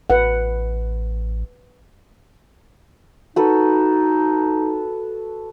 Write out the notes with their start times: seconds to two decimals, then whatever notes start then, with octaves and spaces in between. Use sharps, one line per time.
0.10 A1 B4 F#5
3.36 D#4 F#4 A4 B4